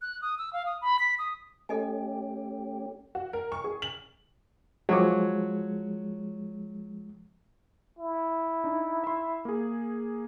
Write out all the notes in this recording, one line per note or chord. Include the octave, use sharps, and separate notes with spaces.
F#6
D#6
E6
F5
D#6
B5
B6
D#6
A3 C#4 G4 A4 D#5 G#5
F#4
A#4
C#6
G#4
F#7
F3 F#3 G#3 C#5 D6
E4
D4 D#4
E5 C6
A#3 G#4